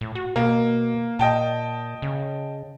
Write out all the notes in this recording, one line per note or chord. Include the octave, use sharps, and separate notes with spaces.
A2
F#4
B2 A#3
A#2 D#5 G5 A5
C#3